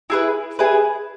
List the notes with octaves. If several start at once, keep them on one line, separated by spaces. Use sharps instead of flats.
E4 G#4 B4
E4 G#4 B4